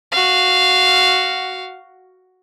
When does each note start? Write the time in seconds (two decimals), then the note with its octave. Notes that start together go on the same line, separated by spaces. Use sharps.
0.12 F#4 F5